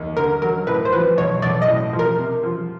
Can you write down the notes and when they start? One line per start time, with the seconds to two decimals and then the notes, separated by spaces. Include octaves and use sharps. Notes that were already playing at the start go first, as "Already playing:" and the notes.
Already playing: D#2
0.17 D3 A#4
0.42 F#3 A#4
0.67 A2 B4
0.85 C5
0.93 F3 B4
1.17 B1 C#5
1.42 B1 D5
1.62 D#5
1.68 A2
1.93 F3
1.99 A#4
2.18 C3
2.43 F3